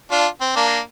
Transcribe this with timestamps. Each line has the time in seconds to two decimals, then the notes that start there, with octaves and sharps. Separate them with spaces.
0.11 D4 F4
0.41 C4
0.56 A#3 D4